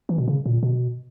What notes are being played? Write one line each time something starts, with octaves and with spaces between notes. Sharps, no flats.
E3
B2
C#3
A#2
B2